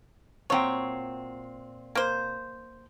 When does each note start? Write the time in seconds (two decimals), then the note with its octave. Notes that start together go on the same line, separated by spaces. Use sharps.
0.50 A#2 F#3 C4 C#5 G5
1.95 A#3 C5